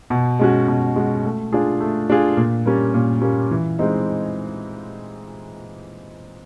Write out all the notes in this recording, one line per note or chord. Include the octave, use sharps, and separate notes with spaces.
B2
G#3 C#4 F#4
B2
G#3 C#4 F#4
A3
D4 F4 G#4
A3
D4 F4 G#4
A#2
G3 A#3 C#4
A#2
G3 A#3 C#4
E3
G#3 C4 D#4